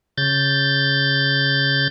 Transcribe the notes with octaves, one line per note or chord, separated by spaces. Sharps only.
C#3 G6 A6